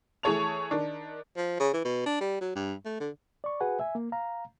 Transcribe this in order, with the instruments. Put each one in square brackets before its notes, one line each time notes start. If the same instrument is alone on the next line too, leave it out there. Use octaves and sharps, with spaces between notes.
[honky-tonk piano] E3 A3 G#4 C#5 A5 F7
D#3 D4
[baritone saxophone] F3
C#3
E3
B2
D4
G3
F#3
G2
A3
D3
[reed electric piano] D5 C#6
F#4 G#4 B4 F#5 G#5
E5 G#5
A#3
F5 A#5